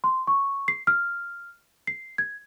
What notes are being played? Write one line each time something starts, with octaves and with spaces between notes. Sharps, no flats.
C6
C#6
C7
F6
C7
G#6